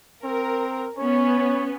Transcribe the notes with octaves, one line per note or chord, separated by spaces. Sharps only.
C4 A#4
B3 C#4 C#5